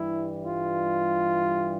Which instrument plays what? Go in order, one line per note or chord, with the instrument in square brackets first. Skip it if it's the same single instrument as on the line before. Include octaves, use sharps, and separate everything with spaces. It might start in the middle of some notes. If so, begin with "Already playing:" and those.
Already playing: [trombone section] G2 E3 G3 E4
F4